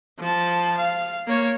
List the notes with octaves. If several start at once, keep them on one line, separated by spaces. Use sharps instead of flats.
F3 A5
F5
A#3 C#5